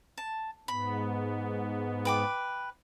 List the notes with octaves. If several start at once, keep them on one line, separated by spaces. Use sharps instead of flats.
A5
G#2 B3 B5
B4 G5 D6